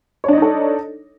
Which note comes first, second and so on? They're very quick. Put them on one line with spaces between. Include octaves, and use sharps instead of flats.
C#5 D4 D#5 D#4 A4